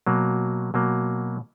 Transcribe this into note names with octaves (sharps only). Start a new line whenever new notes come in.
B2 F#3 A#3
B2 F#3 A#3